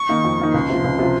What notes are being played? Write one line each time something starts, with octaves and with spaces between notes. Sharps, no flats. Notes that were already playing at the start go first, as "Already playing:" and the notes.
Already playing: C#6
D#3 A#3 D#4
F2
D#3 A#3 D#4
C#2 C6
C3 F3
C#2
C3 F3